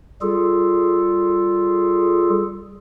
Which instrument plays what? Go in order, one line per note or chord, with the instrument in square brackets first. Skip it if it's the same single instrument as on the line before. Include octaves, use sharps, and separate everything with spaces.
[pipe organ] G3 F4 G#4 A4